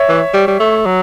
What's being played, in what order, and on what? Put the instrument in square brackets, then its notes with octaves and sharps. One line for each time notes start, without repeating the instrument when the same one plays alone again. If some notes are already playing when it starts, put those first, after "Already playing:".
Already playing: [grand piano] C#5 E5
[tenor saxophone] E3
G3
G3
A3
F#3